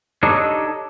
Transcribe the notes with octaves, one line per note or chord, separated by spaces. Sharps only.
D4 D#4 G4 A4 C#5 D#5